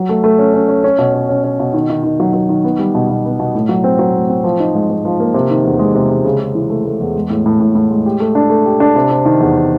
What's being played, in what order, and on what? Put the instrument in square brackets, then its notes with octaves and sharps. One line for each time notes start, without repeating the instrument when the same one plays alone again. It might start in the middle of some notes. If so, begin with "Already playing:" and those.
Already playing: [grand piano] F#3
A3
A3
C#4
C#4
C#4
C#4
B2
C#4
C#4
C#4
B2
D#3
D#3
D#3
F#3
F#3
D#3
B3
G3
B2
B2
B3
B2
A2
F#3
C4
F#3
A2
C4
F3
D#4
G#2
G#2
F3
A#3
C3
D#3
E2
G#3
C3
G#3
C#3
C#3
E3
A3
A3
E2
G#3
A2
A2
A2
A2
G#3
G4
A3
D4
A3
G4
D4
C3
C3
D#3
E2